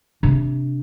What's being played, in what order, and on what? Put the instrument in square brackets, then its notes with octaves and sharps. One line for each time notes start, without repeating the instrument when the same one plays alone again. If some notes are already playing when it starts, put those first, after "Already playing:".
[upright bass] C3 D4